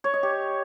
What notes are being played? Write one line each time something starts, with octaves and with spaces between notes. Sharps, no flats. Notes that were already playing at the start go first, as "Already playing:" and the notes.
C#5
D#5
G4